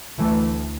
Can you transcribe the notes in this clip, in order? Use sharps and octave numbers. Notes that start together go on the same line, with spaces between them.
D2 E3 A3